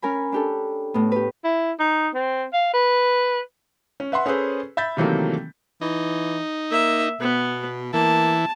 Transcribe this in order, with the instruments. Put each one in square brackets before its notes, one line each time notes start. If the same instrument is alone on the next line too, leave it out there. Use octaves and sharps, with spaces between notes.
[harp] C#4 A#4 G#5 B5
D4 G4 A4
A2 B3
G4 B4
[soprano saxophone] E4
D#4
C4
F5
B4
[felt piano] C#4
B4 E5 F#5 C6
C#4 G#4 A4 B4 C5
E5 B5 G6 A6 B6
C3 D#3 E3 F#3 A3 A#3
[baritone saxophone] E3 [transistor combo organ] D#4
[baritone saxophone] A#3 [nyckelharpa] E5
[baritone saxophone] B2 [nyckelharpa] B3
[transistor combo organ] E3 [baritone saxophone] A#3 [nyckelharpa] A5